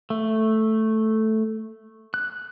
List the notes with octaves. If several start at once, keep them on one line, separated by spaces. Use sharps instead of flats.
A3
F#6